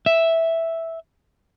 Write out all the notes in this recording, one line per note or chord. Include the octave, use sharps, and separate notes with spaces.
E5